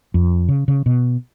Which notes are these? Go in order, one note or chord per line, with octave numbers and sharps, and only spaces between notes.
F2
C#3
C#3
B2